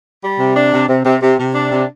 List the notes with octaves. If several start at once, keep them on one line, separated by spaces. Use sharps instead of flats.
G3
C3
D4
C3
C3
C3
C3
C3
D4
C3